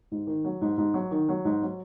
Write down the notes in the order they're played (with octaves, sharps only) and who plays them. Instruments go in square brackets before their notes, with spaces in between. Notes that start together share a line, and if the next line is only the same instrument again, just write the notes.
[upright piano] G#2
D#3
F#3
G#2
G#2
F#3
D#3
F#3
G#2
F#3